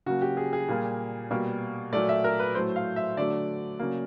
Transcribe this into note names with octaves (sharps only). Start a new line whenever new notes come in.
C#3 F#3 A#3 F#4
G4
G#4
G#4
A#2 G3 A#3
B2 G3 A#3
A#2 F#3 A3 D5
E5
A#4
B4
A2 F#3 A3 C5
F5
E5
D3 F#3 A3 D5
C#3 F#3 A#3